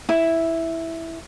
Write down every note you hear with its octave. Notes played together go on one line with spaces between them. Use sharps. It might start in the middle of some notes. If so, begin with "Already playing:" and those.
E4